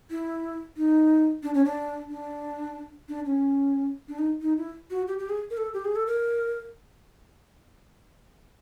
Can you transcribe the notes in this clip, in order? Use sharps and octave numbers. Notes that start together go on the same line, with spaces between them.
E4
D#4
D4
C#4
D4
D4
D4
C#4
D4
D#4
D#4
E4
F#4
G4
G4
G#4
A#4
A4
G4
G#4
A4
A#4